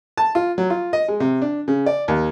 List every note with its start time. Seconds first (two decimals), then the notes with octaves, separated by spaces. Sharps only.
0.17 A5
0.35 F4
0.58 F#3
0.70 F4
0.93 D#5
1.08 G#3
1.20 C3
1.42 D4
1.68 C#3
1.86 D5
2.08 D#2